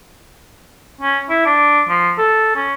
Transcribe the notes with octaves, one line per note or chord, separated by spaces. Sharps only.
C#4
E4
D4
F3
A4
C#4